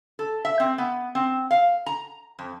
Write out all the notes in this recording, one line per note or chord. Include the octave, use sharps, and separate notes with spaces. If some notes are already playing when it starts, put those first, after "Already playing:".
A4
E5
C4
B3
C4
F5
A#5
F2